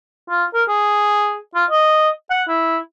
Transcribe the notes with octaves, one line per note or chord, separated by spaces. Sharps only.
F4
A#4
G#4
F4
D#5
F#5
E4